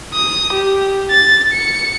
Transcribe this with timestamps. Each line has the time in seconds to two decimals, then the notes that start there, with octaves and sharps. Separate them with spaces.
0.14 D#6
0.53 G4
1.10 A6
1.53 C#7